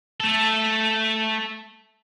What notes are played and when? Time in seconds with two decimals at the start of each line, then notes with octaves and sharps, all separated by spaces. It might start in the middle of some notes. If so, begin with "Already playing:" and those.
0.20 A3 A4